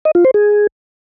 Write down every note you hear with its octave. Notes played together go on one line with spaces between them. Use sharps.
D#5
F4
C5
G#4